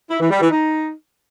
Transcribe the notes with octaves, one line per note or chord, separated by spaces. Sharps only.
E4
E3
G3
E3
D#4